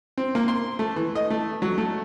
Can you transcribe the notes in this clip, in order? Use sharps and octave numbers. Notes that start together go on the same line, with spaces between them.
C4
A#3
C6
A3
E3
D#5
A3
F#3
A3